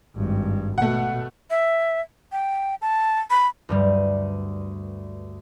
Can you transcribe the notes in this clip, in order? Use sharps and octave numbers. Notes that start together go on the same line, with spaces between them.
G#1 G2
B2 A3 F#5
E5
G5
A5
B5
D2 G2 G3